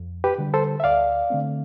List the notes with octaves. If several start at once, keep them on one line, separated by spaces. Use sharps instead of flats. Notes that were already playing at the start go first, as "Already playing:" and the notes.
Already playing: F2
G4 B4
D3 G3
A4 C5
E5
D2 D5 F5
D3 A3 C4